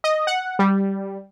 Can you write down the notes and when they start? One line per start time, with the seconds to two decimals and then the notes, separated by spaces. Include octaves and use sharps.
0.04 D#5
0.27 F#5
0.59 G3